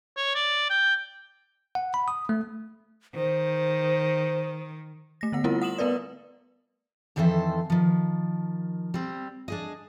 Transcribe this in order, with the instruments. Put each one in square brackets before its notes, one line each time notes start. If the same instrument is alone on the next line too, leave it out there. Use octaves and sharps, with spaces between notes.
[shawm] C#5
D5
G5
[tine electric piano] F#5
B5
D#6
A3
[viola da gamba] D#3 [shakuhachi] C5
[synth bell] A3 A#6
D3 B3 F#5
G3 C4 E4 F4 A#4 F#5
F#5 D#6 E7 F#7
A3 B3 A#4 B4 D5
[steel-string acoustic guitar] F2 D#3 E3 A4 C5 E5
D#3 F3
G3 C4
D4 G#4 D#5